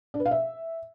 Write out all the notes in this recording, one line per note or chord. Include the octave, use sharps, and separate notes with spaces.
D4
B4
F5
E5